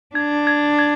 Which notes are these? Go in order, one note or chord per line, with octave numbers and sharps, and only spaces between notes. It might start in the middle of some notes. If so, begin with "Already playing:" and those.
D4 G#6
G#6
G#6